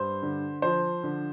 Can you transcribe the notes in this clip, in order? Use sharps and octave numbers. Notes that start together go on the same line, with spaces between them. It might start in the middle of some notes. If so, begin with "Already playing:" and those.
Already playing: G2 C5
D3
F3 C5
D3